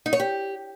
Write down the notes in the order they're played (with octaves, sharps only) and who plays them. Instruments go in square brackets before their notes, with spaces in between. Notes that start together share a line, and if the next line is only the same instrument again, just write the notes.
[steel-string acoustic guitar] D#4
C#5
G4